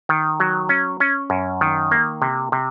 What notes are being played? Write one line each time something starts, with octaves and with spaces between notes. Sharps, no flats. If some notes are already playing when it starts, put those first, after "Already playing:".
D#3
F#3
C#4
C#4
F#2
D#3
A#3
C3
C3